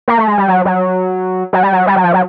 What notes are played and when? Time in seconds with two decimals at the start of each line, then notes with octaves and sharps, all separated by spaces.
0.08 A#3
0.19 A3
0.27 G#3
0.38 G3
0.48 F#3
0.65 F#3
1.53 F#3
1.63 G3
1.73 F#3
1.87 G3
1.96 F#3
2.04 F3
2.14 F#3